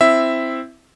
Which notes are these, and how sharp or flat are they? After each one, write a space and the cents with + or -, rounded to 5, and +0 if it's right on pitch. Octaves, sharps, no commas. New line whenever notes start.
C4 +0 E4 +5 E5 +0